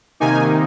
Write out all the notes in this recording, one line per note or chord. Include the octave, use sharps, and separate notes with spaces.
C3 D#3 A#3 D#4 G#5